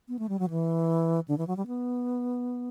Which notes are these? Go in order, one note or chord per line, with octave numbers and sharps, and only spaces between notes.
B3
A3
G3
F#3
E3
D3
E3
F#3
G3
B3